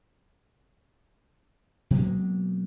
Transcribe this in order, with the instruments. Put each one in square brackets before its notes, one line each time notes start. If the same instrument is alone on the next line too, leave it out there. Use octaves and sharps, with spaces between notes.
[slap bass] B2 F#3 G#3 A#3